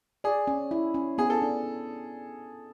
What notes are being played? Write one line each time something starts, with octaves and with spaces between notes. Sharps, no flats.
G#4 D5
C#4
E4
C#4
B3 G#4
A4
D4